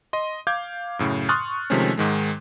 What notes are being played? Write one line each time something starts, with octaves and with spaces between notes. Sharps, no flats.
D#5 C6
F5 D6 G6 G#6
F#2 A2 C#3
C6 C#6 D#6 F6 F#6 A6
C3 D#3 F3 G#3 A3 C#4
G#2 D#3 G#3